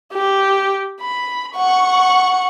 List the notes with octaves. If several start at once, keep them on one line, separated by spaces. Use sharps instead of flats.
G4
B5
F#5 C#6